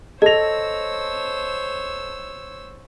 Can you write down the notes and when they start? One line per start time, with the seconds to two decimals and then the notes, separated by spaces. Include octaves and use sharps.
0.22 A4 C5 C#5 D#5 E6 A#6 F7